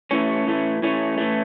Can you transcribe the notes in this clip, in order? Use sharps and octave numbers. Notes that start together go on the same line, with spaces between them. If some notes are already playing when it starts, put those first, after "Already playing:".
A2 E3 A3 C#4
A2 E3 A3
A2 E3 A3 C#4
A2 E3 A3